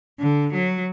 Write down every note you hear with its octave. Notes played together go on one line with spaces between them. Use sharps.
D3
F#3